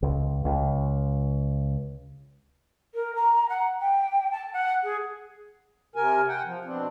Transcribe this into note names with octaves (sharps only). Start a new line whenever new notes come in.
C#2
C#2
A#4
A#5
F#5
G5
A5
F#5
G#4
C3 A#4 G#5
F#5 G5
F3
B2 C4 D4